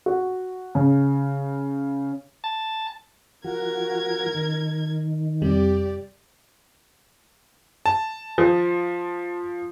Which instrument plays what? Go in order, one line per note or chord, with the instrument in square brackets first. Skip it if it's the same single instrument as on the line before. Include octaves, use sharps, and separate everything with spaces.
[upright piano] F#4
C#3
[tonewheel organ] A5
[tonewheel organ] F3 F#4 [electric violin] A#4 G#6
[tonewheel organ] D#3
[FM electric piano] F2 C3 G3 [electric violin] G4 D5
[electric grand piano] A5
[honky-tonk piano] F3